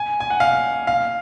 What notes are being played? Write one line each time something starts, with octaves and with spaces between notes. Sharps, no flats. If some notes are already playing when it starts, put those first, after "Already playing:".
Already playing: G#5
G#5
F#5
F5
F5